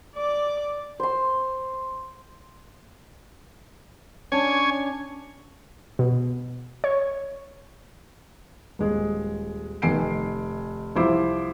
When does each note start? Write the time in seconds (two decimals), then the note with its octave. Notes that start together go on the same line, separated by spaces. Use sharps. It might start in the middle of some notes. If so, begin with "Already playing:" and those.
0.15 D5 D6
1.00 C5 C6
4.32 C#4 D4 C#5 G#5
5.99 B2
6.84 C#5
8.79 D#1 G#3 G#4
9.82 F1 D#3 G#5 C7 D7
10.96 C2 F3 E4 C5 D6